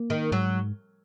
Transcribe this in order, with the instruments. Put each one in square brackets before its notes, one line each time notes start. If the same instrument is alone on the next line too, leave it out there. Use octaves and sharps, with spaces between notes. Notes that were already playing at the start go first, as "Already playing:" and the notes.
Already playing: [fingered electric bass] A#3
[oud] D#3
[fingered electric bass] G#2 [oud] F#3